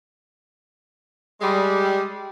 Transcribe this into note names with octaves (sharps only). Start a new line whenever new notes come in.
G3 G#3